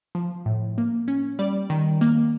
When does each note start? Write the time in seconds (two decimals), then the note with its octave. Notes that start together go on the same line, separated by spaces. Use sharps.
0.15 F3
0.46 A2
0.78 A#3
1.08 C#4
1.39 G3 D5
1.70 D#3
2.01 A#3